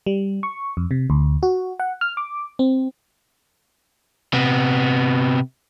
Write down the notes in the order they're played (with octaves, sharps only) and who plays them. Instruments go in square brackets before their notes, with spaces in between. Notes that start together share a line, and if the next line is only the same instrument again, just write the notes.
[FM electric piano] G3
C#6
F2
C3
D2
F#4
F#5
F6
D6
C4
[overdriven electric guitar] C3 B3